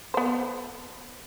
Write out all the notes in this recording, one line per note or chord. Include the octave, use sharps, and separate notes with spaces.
B3 C5